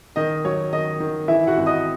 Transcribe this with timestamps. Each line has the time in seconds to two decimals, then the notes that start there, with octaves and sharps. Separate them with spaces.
0.16 D#3 D#5
0.45 F#3 C#5
0.73 D#3 D#5
1.00 D#3
1.28 E3 E4 E5
1.47 F#4 F#5
1.57 G#1
1.66 D#5 D#6